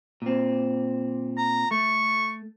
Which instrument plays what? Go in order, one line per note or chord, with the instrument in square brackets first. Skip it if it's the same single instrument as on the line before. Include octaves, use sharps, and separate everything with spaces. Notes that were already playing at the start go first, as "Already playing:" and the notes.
[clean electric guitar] A#2 C4
[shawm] A#5
[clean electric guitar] A3 [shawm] C#6